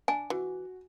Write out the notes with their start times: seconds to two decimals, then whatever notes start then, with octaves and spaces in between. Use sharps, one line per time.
0.08 D4 G#5
0.30 E3 F#4